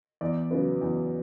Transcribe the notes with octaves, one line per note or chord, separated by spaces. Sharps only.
E2 D5
C#3 F#3 B3
E2